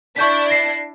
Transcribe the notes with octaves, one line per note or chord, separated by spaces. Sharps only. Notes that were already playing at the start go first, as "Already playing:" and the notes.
D4 E4 C#6 G6 B6
A#6 C7